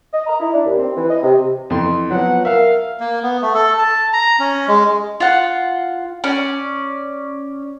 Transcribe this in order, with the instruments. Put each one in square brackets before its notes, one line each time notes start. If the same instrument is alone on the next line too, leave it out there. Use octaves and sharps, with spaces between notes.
[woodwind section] D#5
A#5
E4
D4
D#2
C4
E3
D#5
C3
[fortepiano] F2 E3 C6
[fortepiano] F3 F#3 [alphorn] B3 [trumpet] F#5
[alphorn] A#4 [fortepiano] E5 [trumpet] F5
[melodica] A#3
B3
A3
A4
A5
A#5
C#4
G#3
[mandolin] F4 F#5
C#4 D5